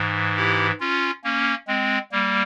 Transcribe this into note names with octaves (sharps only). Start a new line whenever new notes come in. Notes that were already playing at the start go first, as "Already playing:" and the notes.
Already playing: G#2 E3
E4 G4
C#4 F4
A#3 C#4
G#3 C4
G3 A#3